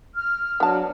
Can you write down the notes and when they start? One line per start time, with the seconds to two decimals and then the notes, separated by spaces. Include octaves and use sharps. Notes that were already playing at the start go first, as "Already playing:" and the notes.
0.15 F6
0.60 F#3 B3 D4 A5